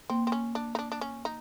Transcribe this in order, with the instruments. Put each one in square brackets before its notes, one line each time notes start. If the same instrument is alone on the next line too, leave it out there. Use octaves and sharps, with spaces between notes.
[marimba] A#3 [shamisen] C4
[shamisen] C4
C#4
D4
D#4
D4
D4
C#4
D#4